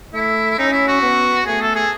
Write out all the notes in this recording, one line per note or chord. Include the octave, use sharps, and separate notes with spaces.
A3 E4
C#4 D#4
E4
F#4
B3
A3 G#4
A4
G#4